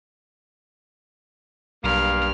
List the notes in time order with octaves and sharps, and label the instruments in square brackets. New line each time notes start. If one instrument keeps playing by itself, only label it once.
[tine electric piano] B1 [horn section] G2 G3 A#3 [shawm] F5 [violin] F6